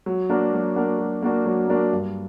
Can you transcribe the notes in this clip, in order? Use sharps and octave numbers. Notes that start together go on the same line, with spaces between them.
F#3
A#3 D4 F#4 A#4
F#3
A#3 D4 F#4 A#4
F#3
A#3 D4 F#4 A#4
F#3
A#3 D4 F#4 A#4
G2